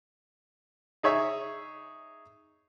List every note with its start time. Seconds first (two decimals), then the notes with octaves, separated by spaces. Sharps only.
1.03 D#4 G#4 C#5 E5